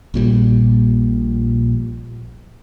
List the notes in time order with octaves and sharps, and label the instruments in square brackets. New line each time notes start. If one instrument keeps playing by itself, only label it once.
[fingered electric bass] A#1 A#2 F3 G3